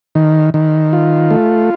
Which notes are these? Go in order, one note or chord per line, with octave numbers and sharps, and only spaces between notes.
D#3
D#3
F4
A3